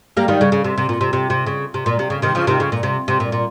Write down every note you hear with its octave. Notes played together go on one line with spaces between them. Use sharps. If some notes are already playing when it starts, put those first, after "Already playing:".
G3 A#3
D#3 G3
C#3
C#3
C3
C3
A#2
C3
C3
C3
C#3
C3
A#2
C3
C#3
C3 D#3
C#3 F3
C3 D#3
C#3
A#2
C3
C3
A#2
A#2